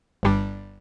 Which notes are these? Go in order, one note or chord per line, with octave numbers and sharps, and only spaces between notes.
G1 G2 G3 D4